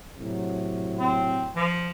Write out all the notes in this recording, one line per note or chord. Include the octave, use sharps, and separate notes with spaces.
A2 C3 F#3
C4
F3